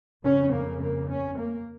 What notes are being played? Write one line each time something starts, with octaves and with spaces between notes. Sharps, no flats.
F2 C#3 C#4
A#3
A#3
C#4
A#3